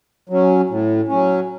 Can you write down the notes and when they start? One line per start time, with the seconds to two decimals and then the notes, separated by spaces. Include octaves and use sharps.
0.29 F#3 C#4
0.69 A2
1.08 F#3 C#4